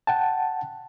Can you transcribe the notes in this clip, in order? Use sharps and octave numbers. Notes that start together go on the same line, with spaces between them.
F#5 G5 A5